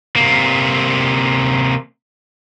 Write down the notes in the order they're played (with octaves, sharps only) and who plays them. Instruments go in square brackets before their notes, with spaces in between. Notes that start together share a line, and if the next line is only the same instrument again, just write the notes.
[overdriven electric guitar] C3 A#3